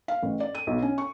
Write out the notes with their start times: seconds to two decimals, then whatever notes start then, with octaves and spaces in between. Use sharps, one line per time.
0.08 F5
0.23 A1
0.40 D5
0.55 D#7
0.67 B1
0.82 C#4
0.98 C#6